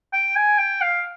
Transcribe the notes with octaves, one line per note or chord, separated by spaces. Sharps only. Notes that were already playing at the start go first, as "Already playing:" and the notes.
G5
G#5
G5
F5